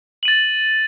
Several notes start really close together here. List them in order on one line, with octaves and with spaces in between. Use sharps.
F#7 D#7 A6